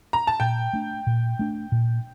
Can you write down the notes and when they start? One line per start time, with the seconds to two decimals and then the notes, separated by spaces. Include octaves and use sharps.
0.13 A#5
0.27 A5
0.40 A#2 G5
0.73 A3 D4
1.07 A#2
1.39 A3 D4
1.72 A#2